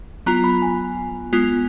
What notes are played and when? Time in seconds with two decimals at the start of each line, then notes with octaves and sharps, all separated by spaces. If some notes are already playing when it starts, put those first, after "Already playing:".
0.26 F#3 B3 F4 A#5
0.44 B5
0.62 G#5
1.33 G#3 B3 F4